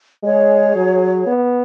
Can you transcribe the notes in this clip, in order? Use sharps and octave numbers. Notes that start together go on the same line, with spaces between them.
G#3 G#4 C#5
F#3
B3